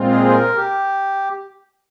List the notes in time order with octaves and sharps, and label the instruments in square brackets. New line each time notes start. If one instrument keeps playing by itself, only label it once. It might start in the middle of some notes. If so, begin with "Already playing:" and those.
Already playing: [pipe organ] A#2 G#3 C4 F4
[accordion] G#4
C5
A#4
G4